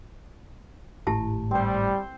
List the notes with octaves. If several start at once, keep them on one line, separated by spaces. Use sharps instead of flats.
G#1 A2 E4 G4 A5
G3 C4 C5